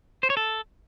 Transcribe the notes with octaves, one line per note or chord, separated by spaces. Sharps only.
C5
C#5
A4